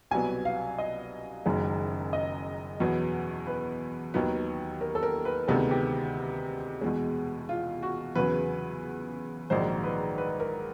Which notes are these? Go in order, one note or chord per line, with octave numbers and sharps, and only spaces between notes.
C2 B2 F#3 B3 G#5
F5
D#5
F#1 F#2 D#3 G#3
D#5
E2 B2 F#3 B3
B4
D#2 D#3 F#3 B3
A#4
A4
A#4
B4
D2 C3 D#3 G#3 B3 A4
G4
E2 B2 G#3
F4
F#4
E2 C#3 F#3 B4
A#1 G#2 D#3 F#3 C5
B4
B4
A#4